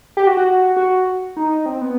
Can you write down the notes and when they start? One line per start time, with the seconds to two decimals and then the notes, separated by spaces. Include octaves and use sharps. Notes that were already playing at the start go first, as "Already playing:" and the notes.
0.17 G4
0.27 F#4
0.37 F#4
0.77 F#4
1.37 D#4
1.66 C4
1.81 B3